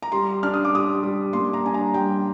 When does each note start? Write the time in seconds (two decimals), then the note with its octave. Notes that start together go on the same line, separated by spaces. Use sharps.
0.02 A#5
0.12 G3 C6
0.43 D4 F6
0.54 D#6
0.65 D6
0.73 G3 D#6
1.03 G3
1.33 A#3 C6
1.53 A#5
1.64 D4 G#5
1.74 A#5
1.94 G3 G5